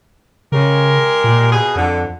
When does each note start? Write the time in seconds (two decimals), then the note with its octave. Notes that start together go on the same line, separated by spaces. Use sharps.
0.52 C#3 G#3 G4 A#4
1.24 A#2
1.51 B2 G#4
1.76 F2 D3